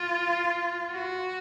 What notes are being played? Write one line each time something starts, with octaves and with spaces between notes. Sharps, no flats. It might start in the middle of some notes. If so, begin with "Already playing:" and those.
Already playing: F4
F#4